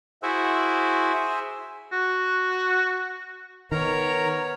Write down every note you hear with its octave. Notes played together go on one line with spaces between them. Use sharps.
E4 F#4 G#4 C5 E5
F#4
D#3 B3 A#4 C#5 A#5